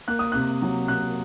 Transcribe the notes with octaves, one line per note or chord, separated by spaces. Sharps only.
A#3 F#6
D#6
C3 F#6
F#3
C3 F#6